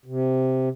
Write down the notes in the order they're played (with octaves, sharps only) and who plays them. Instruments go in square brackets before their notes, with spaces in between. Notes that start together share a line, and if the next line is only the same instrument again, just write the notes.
[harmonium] C3